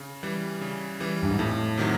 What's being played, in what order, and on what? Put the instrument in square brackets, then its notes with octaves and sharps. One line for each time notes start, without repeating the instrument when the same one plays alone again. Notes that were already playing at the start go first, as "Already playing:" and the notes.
Already playing: [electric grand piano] C#3
E3 G3
C#3
E3 G3
[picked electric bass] G2
G#2
[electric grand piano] F2 [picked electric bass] A2
[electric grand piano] C3 D#3 F#3